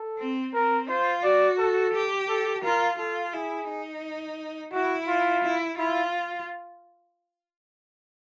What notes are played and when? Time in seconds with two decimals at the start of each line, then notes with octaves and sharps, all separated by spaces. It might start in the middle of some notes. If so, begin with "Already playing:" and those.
Already playing: A4
0.19 C4
0.54 C4 A#4
0.89 F4 C5
1.23 F#4 D5
1.58 A4
1.93 G4
2.29 A4
2.64 F4 A#4
2.98 F4 A4
3.33 E4 G#4
3.69 D#4
4.73 E4 F#4
5.08 F4
5.43 E4
5.78 E4 F4